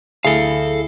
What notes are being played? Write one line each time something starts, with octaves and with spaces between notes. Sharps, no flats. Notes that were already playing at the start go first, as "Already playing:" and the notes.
D2 E4 G#4 A4 F5